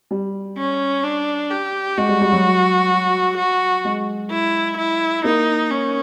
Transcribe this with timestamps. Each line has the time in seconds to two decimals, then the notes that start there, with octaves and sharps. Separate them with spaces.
0.11 G3
0.57 C#4
1.04 D4
1.51 G4
1.98 G#3 F#4
2.09 G3
2.21 G3
2.32 F#3
3.37 F#4
3.85 G#3
4.31 E4
4.78 E4
5.24 A#3 D#4
5.71 C#4